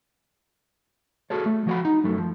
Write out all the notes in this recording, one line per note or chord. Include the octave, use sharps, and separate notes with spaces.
F#4 G#4 A4 C#5
A3
F3 F#4 C5 F#5 B5
D#4
F#2 F#3 A3
F3